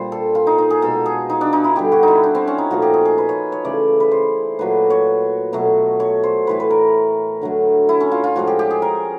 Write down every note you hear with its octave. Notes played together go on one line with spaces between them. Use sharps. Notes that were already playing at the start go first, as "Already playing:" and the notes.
Already playing: A#2 G3 C5
A4
F4
D#4
D#4
G#4
B2 G#3 A4
G#4
D#4
D4
D#4
E4
D3 G3 G4
F#4
D#4 E4
D4
C4
C#4
D#4
A#2 F3 A3 F#4
G4
G#4
G#4
B4
C#5
C#5
C#3 E3 A3 D5
B4
C5
A#2 F#3 A3 B4
C#5
B2 F#3 A3
C#5
C5
A2 E3 A3 B4
B4
A#4
D3 F#3 A3
E4
C#4
F4
F4
A2 F3 G#3 F#4
G4
G4
G#4
A#4